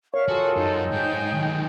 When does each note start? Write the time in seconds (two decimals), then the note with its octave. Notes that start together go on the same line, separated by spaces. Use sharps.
0.14 A#4 C#5 E5 F5 C#6
0.28 F4 F#4 G#4 A4
0.56 F#2 D#4
0.92 G#2 G#4 G5 G6
1.33 D#3 F#3